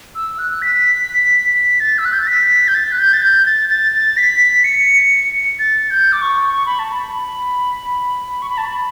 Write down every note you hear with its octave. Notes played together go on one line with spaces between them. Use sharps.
E6
F#6
B6
A6
E6
F#6
G6
A6
B6
G6
A6
F#6
G6
A6
G6
A6
A6
B6
C#7
A6
G6
D6
C#6
C#6
B5
A5
B5
C#6
B5
A5
B5